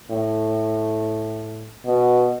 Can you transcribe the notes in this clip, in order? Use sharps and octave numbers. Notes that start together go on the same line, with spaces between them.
A2
B2